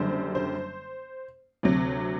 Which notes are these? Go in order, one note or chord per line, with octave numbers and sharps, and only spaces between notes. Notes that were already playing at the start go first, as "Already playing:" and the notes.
Already playing: F#1 F#2 D3 G3 C5
C5
D2 C3 F#3